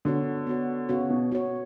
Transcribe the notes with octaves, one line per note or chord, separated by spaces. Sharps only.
D3 B3 F#4 C#5
B3 F#4 C#5
C#3 B3 F#4 C#5
B2
B2 B3 F#4 C#5